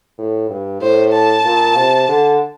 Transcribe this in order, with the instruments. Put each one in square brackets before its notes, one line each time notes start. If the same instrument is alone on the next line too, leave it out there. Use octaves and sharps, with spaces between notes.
[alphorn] A2
G2
[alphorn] A2 [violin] C5
[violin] A5
[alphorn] A#2
C3
D3